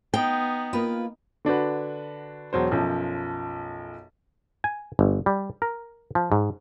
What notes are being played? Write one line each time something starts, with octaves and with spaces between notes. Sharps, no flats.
B3 D#4 G5
A#3 F4 B4
D3 D4 F#4 B4
E1 F#3 C5
B1 F#2 F3
G#5
G1
G3
A#4
F3
G#2